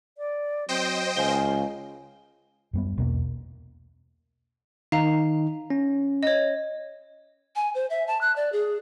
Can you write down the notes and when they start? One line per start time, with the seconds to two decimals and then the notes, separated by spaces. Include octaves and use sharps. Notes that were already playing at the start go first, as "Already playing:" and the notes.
0.18 D5
0.69 F#3 C4 C5 D#5 G5
1.16 C#2 F5 G#5 G7
2.73 F#2 G3 B3
2.97 B1 E2 B2 A#3
4.92 D#3 D#4 F5 A#5
5.70 C#4
6.23 C#5 D#5
7.56 G#5
7.75 C5
7.90 E5
8.07 A5
8.21 F#6
8.36 D5
8.52 G#4